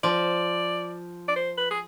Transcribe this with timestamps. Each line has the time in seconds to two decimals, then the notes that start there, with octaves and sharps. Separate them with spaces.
0.03 F3 D5
1.28 D5
1.36 C5
1.57 B4
1.71 G#4